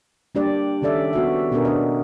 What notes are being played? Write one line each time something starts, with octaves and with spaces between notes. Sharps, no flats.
G3 A#3 D4 G4 D5
D#3 C#4 A4 D5 E5
B3 F#4 E5
B2 B3 C#4 D4 G#4 A#4
D4 D#5